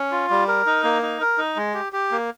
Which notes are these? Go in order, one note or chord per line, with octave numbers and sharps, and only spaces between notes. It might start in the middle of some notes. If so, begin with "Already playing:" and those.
Already playing: C#4
F4
G3
A#4
D#4
A#3
D#4
A#4
D#4
G#3
G4
G4
A#3